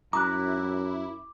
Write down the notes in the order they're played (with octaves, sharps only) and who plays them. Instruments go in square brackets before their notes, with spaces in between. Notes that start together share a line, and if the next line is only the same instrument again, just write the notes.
[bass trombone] F#2 [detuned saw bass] E4 [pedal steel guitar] A#5 F#6 [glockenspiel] D6